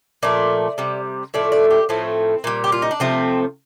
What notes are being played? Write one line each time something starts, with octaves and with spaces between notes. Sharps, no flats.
A#2 F3 A3 D5
C3 G3
A2 F3 A3 D5
D5
G4
A2 F3 A3 C4
A#2 G3
G4
F4
D#4
D4
C3 F3 A3 C4